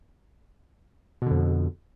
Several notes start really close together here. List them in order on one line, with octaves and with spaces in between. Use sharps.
B2 D3 F2